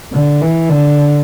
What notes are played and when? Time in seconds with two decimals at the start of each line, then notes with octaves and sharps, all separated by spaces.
0.13 D3
0.41 E3
0.69 D3